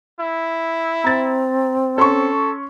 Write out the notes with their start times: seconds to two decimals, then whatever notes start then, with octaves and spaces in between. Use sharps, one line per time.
0.20 E4
1.04 C4 A#5 A6
1.98 C#4 A4 C6 C#6